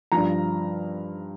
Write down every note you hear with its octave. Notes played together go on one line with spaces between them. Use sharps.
G2 F3 A#5